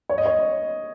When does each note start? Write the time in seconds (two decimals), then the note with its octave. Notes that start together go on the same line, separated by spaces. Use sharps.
0.09 C#5
0.18 D#5
0.26 C#5